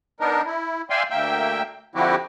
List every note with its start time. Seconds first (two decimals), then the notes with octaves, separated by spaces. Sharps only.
0.20 B3 D4 D#4 A#4
0.46 E4
0.90 D5 E5 F5 G5 G#5 C6
1.10 D2 A#3 E5 G5
1.95 D3 F3 C4 E4 F#4 G4